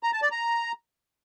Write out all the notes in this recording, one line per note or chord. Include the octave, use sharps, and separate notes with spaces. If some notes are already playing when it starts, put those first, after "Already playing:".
A#5
A5
D5
A#5